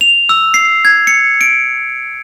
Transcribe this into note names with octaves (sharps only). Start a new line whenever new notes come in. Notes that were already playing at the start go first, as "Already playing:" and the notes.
F7
E6
C7
G#6
C#7
D7